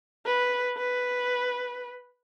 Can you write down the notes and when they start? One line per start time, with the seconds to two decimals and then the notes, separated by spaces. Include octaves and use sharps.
0.26 B4
0.77 B4